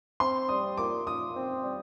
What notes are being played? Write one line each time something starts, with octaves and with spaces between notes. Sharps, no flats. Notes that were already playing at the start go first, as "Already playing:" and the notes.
C4 C6
G3 D#6
A#2 D6
A#2 D#6
C4
G3